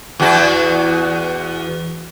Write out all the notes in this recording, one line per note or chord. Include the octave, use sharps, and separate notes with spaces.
E2 F#4